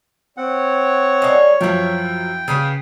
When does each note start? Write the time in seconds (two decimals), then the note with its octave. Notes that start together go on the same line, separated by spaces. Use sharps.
0.37 C4 C#5 F#5
1.22 G3 A#3 D#5 G#5
1.61 F#2 F3 E4 F4 G5
2.48 C#3 B4 F5 G#5